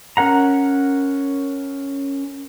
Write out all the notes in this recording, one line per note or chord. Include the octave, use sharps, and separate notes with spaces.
C#4 A#4 F#5 A#5